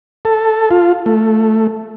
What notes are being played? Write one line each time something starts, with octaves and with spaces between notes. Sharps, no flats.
A4
F4
A3